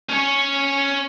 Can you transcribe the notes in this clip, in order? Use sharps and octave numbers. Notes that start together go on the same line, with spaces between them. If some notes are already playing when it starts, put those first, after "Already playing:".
C#4 C#5